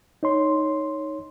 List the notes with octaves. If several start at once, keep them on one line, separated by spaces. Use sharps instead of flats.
D#4 C#5 C6